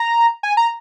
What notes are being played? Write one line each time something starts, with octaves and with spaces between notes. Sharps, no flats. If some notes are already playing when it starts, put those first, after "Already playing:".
Already playing: A#5
G#5
A#5